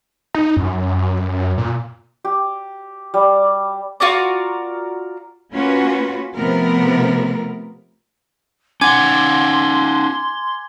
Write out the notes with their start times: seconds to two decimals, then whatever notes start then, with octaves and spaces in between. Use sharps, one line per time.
0.35 D#4
0.57 F#2
1.58 A#2
2.24 G4
3.14 G3
4.00 F4 F#4 A#4 D5
5.52 A#3 C#4 F4 F#4 B4
6.35 C3 F3 A3 B3 A#4
8.81 C#4 D#4 F#5 G#5 C6 D6 G#6